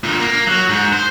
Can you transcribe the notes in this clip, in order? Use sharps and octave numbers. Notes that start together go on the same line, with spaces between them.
A#2 D3
A#3
F#3
G#2
C5